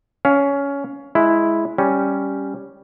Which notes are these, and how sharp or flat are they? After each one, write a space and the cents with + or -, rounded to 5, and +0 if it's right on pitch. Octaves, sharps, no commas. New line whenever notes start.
C#4 +15 F5 +0
G#3 +15 E4 +0
G3 +0 C#4 +0